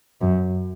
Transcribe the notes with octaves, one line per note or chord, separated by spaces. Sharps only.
F#2